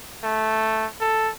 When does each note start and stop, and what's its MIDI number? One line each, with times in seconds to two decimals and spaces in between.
0.24 0.86 57
1.00 1.30 69